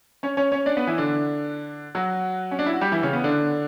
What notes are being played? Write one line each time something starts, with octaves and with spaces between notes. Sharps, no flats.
C#4 C#5
C#4 C#5
C#4 C#5
D4 D5
B3 B4
E3 E4
D3 D4
F#3 F#4
C#4
D4
E4
F#4
G3 G4
E3 E4
C#3 C#4
B3
D3 D4